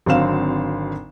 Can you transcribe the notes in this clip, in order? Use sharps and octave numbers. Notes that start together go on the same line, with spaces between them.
G#1 D3 F#3 C4 F5 E7